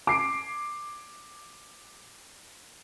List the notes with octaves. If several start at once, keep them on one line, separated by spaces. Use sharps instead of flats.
D6 C7 D7